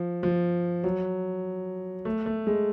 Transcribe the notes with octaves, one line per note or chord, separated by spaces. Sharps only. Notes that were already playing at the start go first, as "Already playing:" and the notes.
Already playing: F3
F3
F#3
A3
A3
G#3